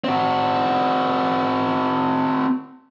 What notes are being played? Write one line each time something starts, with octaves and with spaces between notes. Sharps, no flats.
C4 F#4